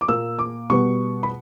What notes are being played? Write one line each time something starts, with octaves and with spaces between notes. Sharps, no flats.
D6
A#2 A#3 E6
D6
B2 G3 B3 C#6
B5